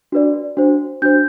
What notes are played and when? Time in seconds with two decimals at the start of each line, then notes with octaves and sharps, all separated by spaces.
0.12 D4 F#4 B4 D5
0.57 D4 F#4 C5
1.02 D4 F#4 C5 G6